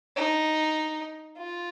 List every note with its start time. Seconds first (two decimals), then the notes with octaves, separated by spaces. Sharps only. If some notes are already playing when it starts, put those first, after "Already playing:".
0.16 D#4
1.39 F4